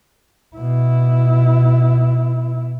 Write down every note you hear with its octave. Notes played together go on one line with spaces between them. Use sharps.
B2 E4